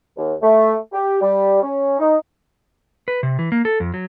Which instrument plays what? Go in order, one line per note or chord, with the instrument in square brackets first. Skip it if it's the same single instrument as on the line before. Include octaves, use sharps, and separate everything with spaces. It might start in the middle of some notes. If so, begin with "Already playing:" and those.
[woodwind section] D#2
A3
G4
G3
C#4
D#4
[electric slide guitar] B4
C3
E3
A#3
A4
F2
F#3